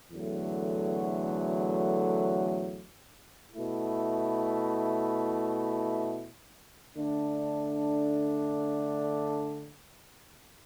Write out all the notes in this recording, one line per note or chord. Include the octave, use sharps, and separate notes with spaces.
E2 D3 F#3 A3
B2 A3 E4
D3 A3 D4